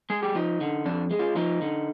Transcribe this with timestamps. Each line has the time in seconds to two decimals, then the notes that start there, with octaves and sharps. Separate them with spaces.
0.10 G#3 G#4
0.23 G4
0.35 F3 D#4
0.61 D3
0.85 F2 D4
1.11 G#3
1.19 F4
1.36 F3 D#4
1.62 D3